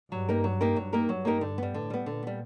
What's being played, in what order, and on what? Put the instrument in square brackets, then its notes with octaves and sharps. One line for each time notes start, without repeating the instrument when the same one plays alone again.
[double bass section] G2 [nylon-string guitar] F#3
[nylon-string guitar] A#3 D#4 G4 A#4
F#3
A#3 D#4 G4 A#4
[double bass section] G2 [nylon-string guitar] F#3
[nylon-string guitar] A#3 D#4 G4 A#4
[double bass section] G2 [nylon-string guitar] F#3
[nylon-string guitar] A#3 D#4 G4 A#4
D3
G3 B3
[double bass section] A2 [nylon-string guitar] D3
[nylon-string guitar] G3 B3
[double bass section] A#2 [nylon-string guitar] D3
[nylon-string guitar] G3 B3